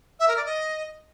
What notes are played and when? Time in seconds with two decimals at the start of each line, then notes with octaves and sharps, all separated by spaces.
0.20 E5
0.28 A#4
0.37 D5
0.45 D#5